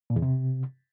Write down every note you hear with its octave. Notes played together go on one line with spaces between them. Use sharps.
A#2
E2
C3